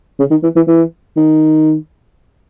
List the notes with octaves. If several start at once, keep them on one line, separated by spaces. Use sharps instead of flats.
C#3
D#3
E3
E3
E3
D#3